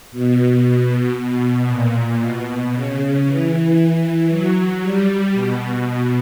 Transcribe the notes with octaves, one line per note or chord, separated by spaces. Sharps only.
B2
B2
A#2
B2
C#3
E3
F#3
G3
B2
B2